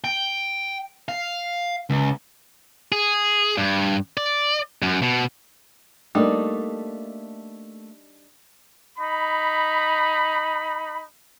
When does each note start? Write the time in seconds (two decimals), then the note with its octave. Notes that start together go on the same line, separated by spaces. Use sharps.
0.04 G5
1.09 F5
1.90 C#2
2.92 G#4
3.58 G2
4.17 D5
4.82 F#2
5.02 B2
6.15 G3 A3 A#3 D4 D#4
8.98 D#4 B5